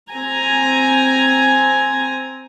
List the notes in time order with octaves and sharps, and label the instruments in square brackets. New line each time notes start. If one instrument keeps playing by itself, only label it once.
[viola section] C4 G#5 A#5